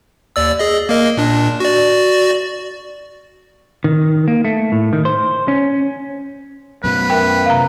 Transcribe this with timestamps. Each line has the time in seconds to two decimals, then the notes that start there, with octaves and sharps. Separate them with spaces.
0.36 D#2 D5 E6
0.59 G#4 D#5
0.89 A#3 A#4 D#5
1.17 A#2 D4
1.60 F#4 D5
3.84 D#3
4.28 A#3
4.45 A3
4.72 A2
4.93 D#3
5.05 C5
5.48 C#4
6.84 F#2 B2 B4
7.10 A#4 E5 G5
7.46 C3 F5 A#5